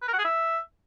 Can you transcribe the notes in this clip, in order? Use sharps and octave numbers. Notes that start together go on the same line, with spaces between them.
B4
A#4
F#5
G#4
E5